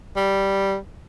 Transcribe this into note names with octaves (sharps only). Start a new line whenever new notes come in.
G3